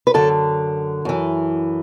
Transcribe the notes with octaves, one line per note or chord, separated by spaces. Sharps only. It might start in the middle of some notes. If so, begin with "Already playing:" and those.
B4
F#2 D3 A4
F#2 E3